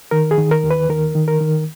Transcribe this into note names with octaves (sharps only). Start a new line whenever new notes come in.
D#3 A#4
G#4
D#3
A#4
D#2
B4
D#3 A#4
D#3
A#4
D#3